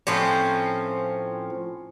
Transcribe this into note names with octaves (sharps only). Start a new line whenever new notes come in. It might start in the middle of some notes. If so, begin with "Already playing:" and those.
A2 F3 C4 C#4